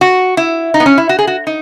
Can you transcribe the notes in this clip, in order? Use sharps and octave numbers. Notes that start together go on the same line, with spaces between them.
F#4
E4
D#4
B3
C#4
E4
F#4
G#4
F#4
D#4